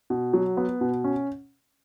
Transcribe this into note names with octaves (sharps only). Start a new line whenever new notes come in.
B2
F#3
B3
B2
C#4